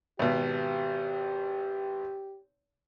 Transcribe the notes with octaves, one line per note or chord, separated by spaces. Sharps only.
G#1 B2 G4